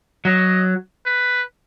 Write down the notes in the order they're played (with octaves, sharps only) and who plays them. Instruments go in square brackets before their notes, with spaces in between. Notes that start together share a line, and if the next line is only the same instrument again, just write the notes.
[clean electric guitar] F#3 [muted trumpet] D#5
[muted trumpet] B4